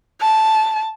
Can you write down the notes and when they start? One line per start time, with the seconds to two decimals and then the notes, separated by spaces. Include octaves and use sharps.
0.21 A5